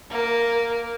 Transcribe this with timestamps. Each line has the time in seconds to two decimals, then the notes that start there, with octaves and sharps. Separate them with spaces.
0.10 A#3